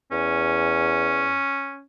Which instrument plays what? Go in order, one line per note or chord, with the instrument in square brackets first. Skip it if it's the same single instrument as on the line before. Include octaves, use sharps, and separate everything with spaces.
[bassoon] E2 [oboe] C#4